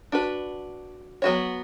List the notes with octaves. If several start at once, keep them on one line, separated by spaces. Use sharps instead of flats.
D4 F#4 B4
F#3 B3 F#4 C#5